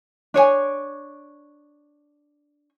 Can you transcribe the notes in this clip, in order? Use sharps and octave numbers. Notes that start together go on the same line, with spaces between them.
D4 C#5 D5 G#5